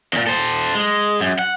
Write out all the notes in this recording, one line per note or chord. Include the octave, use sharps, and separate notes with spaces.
E2 A#2
A4 C5
G#3
F#2
F#5